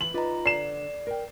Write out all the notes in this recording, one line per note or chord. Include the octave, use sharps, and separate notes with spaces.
E3 F#7
D#4 F4 B4 D5 A#5
D3 D5 C7 E7
A#4 G5